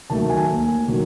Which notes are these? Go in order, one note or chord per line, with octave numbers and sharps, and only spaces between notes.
D#3 F#3 A3 A5
G#5
D#2
D#3 F#3